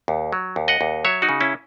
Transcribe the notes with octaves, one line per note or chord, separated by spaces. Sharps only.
D#2
F#3
D#2
D#5 F#5
D#2
F#3 C#5 E5
D#4 F#4
C#3
C#4 E4